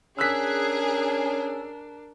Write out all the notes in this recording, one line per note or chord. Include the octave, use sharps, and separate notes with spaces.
C#4 D4 G#4 A#4 E6 F#6 B6